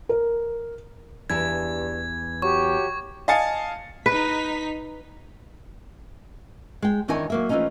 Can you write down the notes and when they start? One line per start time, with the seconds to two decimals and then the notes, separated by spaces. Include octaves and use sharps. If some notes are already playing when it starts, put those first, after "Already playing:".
0.09 A#4
1.30 E2 G2 E3 A5 G#6
2.42 F#3 G4 C#6
3.28 D#5 F5 G#5 A5 A6 C#7
4.06 D#4 B4 B6
6.82 G#3 G5
7.08 E2 D#3 D4 E4 C#5 G#5
7.30 F#3 A#3 E5
7.49 E3 F3 G#3 A3 C#4 D#4